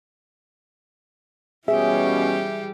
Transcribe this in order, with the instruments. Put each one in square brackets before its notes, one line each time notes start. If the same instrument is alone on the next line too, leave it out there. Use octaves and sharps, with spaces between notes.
[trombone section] B2 C#4 [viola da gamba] E3 G3 G4 [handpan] G#4 [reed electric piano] E5